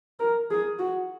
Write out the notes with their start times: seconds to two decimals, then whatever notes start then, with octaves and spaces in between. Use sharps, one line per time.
0.20 A#4
0.51 G#4
0.79 F#4